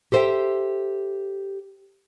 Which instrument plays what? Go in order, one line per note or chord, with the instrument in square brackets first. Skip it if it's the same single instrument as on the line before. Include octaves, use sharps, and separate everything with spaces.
[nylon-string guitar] G4 A4 C5 D#5 E5 G5